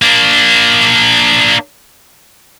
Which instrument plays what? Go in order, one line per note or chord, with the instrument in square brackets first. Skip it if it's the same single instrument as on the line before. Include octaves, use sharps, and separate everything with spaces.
[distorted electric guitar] A#3 D4